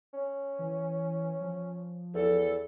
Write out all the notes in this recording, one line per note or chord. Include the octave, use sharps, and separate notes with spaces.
C#4
E3
F3
E2 A4